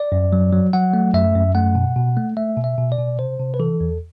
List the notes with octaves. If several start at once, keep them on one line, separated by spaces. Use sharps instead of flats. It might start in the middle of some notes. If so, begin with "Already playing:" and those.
Already playing: D5
F#2
F#3
F#3
F#3 F#5
A3
F#2 E5
F#2
A3 F#5
B2
B2
A3
A3 E5
B2
E5
B2
D5
B2
C3 C5
C3
B4
E3 A4
E2